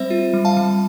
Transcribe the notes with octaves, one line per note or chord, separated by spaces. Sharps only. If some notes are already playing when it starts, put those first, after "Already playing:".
Already playing: G3 C4 C5 E5
F4
G3
F5 A5
G3